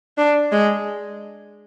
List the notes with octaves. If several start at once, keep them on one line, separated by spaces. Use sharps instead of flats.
D4
G#3